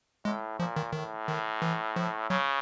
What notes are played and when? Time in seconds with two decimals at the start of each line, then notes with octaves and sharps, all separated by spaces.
0.25 A2 G#3
0.59 A#2 F3
0.76 D#3
0.93 A2 D#3
1.28 D#3
1.62 E3
1.96 F3
2.30 C#3 F#3